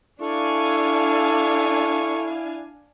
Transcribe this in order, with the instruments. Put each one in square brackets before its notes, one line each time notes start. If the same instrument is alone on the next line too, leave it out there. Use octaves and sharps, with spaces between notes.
[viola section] D4 F5 G#5 [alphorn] E4 [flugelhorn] A4 [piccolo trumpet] C#6